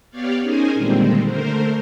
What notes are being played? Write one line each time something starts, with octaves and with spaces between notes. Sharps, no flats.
B3 G4 C#5 D5 F5
C#4 D#4 G#4 A#4 C5 G#5
A#2 D3 D#3 G3 G#3 C4
D3 A3 A#4 C5